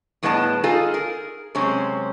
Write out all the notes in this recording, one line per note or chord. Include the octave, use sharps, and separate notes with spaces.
A2 G3 B3 G#4 D#5 A5
D#4 F4 G#4 A4 D#5
G#4 A#4
F#2 C3 G#3 C4 C#4